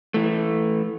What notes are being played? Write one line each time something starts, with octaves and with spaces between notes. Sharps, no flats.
E3 A3